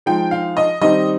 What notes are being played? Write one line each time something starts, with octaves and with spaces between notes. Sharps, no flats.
F3 G#3 D#4 G5
F5
D#5
D#3 G3 C4 D#4 D#5